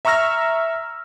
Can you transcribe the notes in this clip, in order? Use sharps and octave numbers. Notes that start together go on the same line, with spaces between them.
E5 A#5 C#6 E6 F6 A#6